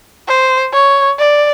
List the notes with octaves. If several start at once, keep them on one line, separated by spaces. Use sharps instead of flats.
C5
C#5
D5